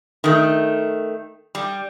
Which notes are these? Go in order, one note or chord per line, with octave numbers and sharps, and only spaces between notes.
D#3 A3
G3